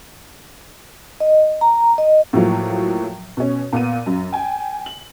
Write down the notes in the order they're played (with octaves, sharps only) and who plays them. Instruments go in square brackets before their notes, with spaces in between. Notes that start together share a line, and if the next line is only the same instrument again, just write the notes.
[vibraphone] D#5
A#5
D#5
[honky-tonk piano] A2 F3 F#3 A#3
B2 C#4
A#2 B3 D#7
F#2
G5 G#5
F#7